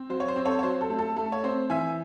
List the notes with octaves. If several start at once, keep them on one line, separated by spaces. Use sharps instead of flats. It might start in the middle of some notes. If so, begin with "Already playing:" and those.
Already playing: C4
F#3 C5
C#5
C5
C4
A4 C#5
C#5
F#3 C5
A4
A3
A4
A3 A4
C#5
C4 C5
E3 E5 G#5